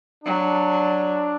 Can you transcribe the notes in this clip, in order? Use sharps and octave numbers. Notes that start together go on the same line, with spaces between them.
F#3 D4